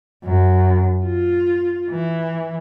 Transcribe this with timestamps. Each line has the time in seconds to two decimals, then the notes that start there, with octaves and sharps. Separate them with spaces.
0.24 F#2
1.06 F4
1.90 E3